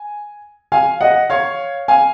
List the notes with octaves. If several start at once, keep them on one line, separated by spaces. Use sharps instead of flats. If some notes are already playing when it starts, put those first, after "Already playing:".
Already playing: G#5
F5 G#5
D#5 F#5
C#5 F5
F5 G#5